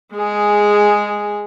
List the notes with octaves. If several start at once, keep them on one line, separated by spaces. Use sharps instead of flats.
G#3 G#4